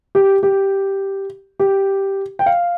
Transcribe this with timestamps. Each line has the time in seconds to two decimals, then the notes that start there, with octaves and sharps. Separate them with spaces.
0.15 G4
0.43 G4
1.60 G4
2.39 G5
2.46 F5